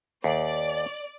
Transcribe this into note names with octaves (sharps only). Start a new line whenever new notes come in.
D#2 D5